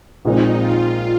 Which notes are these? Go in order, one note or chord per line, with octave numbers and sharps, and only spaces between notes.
A#1 A#2 G#3 C4 D#4
F4